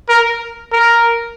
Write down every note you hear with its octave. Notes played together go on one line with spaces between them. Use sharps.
A#4
A#4